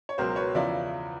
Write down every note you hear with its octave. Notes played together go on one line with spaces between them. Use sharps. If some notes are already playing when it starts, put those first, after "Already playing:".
C#5
C#2 B2 F#3 A#4 C5
B4 C#5
E2 C#3 F3 D5 E5